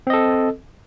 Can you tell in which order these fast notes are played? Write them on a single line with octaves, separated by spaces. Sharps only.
C4 D#5 A4